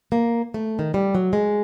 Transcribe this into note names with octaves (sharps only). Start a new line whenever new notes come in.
A#3
A3
D#3
G3
F#3
G#3